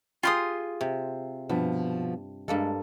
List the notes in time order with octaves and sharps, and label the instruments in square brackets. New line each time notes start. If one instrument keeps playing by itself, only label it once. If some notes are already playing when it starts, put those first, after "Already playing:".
[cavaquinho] F4 C6 D#6 [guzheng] G4 G#4
[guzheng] C3
[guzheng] G2 [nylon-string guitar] B2 F3 B3
[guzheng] G2 A#3 A4 [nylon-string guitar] G#3